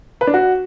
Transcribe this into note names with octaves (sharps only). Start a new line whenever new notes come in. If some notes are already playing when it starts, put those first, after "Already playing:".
B4
D4
F#4